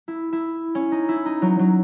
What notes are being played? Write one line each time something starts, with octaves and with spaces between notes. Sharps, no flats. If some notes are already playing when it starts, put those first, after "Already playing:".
E4
E4
C#4
D#4
E4
D#4
F#3
F#3